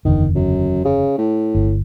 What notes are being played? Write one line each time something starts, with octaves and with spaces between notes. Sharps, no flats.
F#1 E2 D3 D#3
F#2
C#3
A2
G1